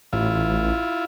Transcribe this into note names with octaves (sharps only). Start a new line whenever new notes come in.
A1 E4 F4